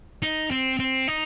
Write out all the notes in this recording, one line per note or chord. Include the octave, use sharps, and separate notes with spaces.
D#4
C4
C4
D#4